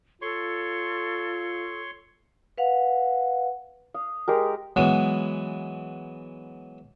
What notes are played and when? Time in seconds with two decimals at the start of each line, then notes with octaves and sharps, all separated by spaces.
0.22 F4 A4 C#5 C6 C#6
2.58 B4 F5 F#5
3.94 F5 D#6
4.28 G#3 G4 A#4
4.76 E3 F#3 G#3 B3